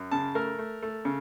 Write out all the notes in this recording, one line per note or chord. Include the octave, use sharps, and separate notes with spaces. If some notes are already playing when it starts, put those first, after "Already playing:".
Already playing: F#2
C#3 A5
A3 A#4
A3
A3
C#3